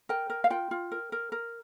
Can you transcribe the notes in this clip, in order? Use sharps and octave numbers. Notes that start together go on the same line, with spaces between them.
A#4 G5
A#4
F5
F4 G5
F4
A#4
A#4
A#4